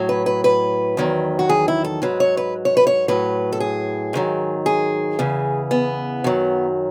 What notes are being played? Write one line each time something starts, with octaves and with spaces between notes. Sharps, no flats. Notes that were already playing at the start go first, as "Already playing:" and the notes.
Already playing: A2 F#3
B4
B4
B4
E2 D#3 F#3
F#4
G#4
E4
A4
G#2 F#3 B4
C#5
B4
C#5
B4
C#5
A2 F#3 B4
A4
G#4
G#2 D#3 F#3
G#4
E2 C#3 E3
B3
F#2 D#3 F#3